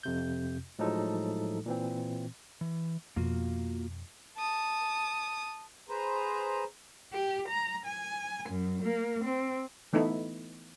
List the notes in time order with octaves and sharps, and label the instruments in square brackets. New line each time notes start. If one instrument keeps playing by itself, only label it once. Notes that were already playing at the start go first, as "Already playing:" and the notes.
[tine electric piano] F2 C3 G6
A2 F3 F#3 G#3 D#4 A4
A#2 E3 C4
[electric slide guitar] E3
[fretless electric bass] F2 B2 [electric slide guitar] A#3 F4 F#4
[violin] A5 D#6
[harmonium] G#4 B4 C5 A#5
[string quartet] G4
A#5
G#5
F#2
A#3
C4
[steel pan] E3 A3 B3 D#4 E4